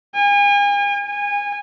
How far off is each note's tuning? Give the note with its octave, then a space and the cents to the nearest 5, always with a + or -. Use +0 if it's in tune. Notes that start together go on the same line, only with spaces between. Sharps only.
G#5 -40
G#5 -25